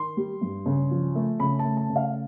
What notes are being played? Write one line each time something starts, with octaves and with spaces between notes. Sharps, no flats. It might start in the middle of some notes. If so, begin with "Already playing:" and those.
Already playing: D#3 C6
G3
G2
C#3
F3
A3
C#3 B5
A5
A3
A5
C#3
F5